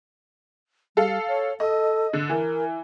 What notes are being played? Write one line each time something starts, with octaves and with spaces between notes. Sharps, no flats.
G3 A4 F5
C#5
A4 D#5
D3
E3 A#4